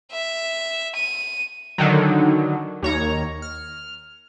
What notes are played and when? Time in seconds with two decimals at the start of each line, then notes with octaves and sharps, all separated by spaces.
0.12 E5
0.96 D#7
1.78 D3 D#3 F#3
2.82 D#2 C#5 A#5
3.42 F6